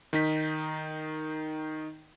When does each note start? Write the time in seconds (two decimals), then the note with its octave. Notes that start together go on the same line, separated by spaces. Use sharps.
0.13 D#3 D#4 B6